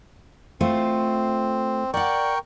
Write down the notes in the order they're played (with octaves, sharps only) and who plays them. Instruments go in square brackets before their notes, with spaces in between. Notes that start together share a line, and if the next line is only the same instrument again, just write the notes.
[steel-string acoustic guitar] A3 F4 C5 [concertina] C4
[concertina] A#4 G5 C#6 [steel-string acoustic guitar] D5 F#5